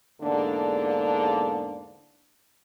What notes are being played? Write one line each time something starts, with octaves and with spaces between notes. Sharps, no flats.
E2 G#2 D3 A#3 D4